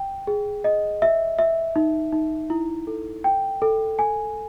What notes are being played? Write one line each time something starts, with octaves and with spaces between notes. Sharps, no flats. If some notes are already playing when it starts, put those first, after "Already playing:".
Already playing: G5
G#4
D#5
E5
E5
D#4
D#4
E4
A4
G5
A4
G#5